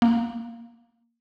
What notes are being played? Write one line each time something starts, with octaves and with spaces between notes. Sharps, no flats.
A#3